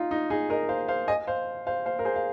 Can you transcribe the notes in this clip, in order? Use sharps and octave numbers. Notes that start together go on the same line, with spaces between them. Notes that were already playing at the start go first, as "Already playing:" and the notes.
Already playing: D#4 F4
D#4
D#4 G#4
A#4 D#5
C5 F5
C5 F5
D#5 G#5
C5 F5
C5 F5
C5 F5
A#4
G#4 C5
F5